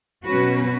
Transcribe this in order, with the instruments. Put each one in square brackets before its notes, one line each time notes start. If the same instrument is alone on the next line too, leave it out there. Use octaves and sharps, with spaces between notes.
[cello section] B2 F#3 C#4 F#4 B4